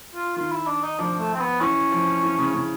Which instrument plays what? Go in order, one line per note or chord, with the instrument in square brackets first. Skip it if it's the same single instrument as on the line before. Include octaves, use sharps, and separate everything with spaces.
[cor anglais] F4
[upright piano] D#3 [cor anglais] F4
[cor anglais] E4
D4
D#4
[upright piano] F3 [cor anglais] D4
[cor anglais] A3
C4
B3
[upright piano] E3 [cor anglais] C#4
[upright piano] F3
E3
C#3
C#3